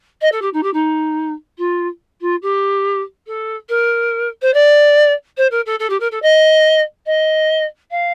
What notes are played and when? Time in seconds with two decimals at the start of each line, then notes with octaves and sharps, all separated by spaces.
0.21 D#5
0.32 A4
0.42 G4
0.53 D#4
0.63 G4
0.73 D#4
1.58 F4
2.21 F4
2.42 G4
3.27 A4
3.69 A#4
4.42 C5
4.54 D5
5.37 C5
5.51 A#4
5.66 A4
5.79 A4
5.90 G4
6.00 A#4
6.11 A4
6.22 D#5
7.06 D#5
7.91 F5